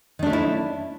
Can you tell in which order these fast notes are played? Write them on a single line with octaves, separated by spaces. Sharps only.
D#3 D4 A3 C#4 E4